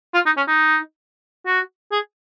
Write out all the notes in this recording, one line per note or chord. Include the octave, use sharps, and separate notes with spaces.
F4
D#4
C#4
D#4
F#4
G#4